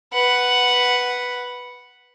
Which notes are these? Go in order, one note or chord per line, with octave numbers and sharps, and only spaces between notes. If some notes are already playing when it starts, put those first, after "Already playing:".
B4 F#5